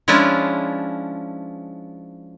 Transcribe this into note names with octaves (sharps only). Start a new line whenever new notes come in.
F3 G#3 C#4 D4 E4 F4